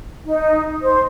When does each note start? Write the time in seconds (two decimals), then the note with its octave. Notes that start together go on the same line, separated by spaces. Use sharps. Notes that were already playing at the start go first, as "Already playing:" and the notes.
0.25 D#4
0.82 C5